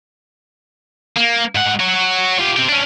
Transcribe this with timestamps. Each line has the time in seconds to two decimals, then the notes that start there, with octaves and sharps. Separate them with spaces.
1.17 A#3
1.55 G#2 F#5
1.80 F#4 C#5
2.39 F4 G4
2.57 C4 G4
2.69 C#4 D4